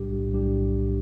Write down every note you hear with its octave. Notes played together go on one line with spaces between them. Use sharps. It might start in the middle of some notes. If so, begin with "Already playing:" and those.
Already playing: B1 A2 G3 D4 G4
B1 A2 G3 D4 G4